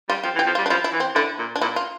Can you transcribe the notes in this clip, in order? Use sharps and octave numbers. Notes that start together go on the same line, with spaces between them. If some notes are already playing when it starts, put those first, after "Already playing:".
G3 F4
F3 G4
E3
G4
F3
F4
G3
D4
F3 E4
E4
E3
C4
D3 E4
A#2
D4
A#2 E4
F4